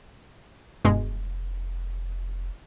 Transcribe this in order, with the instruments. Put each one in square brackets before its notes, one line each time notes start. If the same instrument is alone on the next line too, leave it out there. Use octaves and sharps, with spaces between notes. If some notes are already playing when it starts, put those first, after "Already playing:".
[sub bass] F1 [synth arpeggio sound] G2 B2 G#3